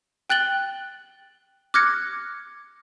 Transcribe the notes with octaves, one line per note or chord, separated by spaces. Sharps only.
G5 F#6 A6 F#7 G7
D6 F6 F#6 G#6 A#6 C#7